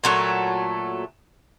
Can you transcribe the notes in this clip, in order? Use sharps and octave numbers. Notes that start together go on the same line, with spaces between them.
A#2 F#3 A3